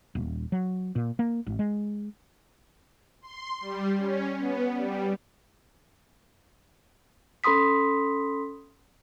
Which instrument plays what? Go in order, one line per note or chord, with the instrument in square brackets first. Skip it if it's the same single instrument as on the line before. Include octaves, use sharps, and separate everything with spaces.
[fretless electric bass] D#1
F#3
A#2
A#3
G#1
G#3
[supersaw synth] C6
G3
C#4
B3
G3
[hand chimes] C#4 A4 B5 C6 D#6 B6